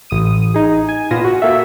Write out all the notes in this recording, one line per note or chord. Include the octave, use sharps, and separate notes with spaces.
A1 D#6 D#7
D#4 G#4
G#5
A#2 B3 F4 G#5 A#6 E7
F#4
A#3 A4 E5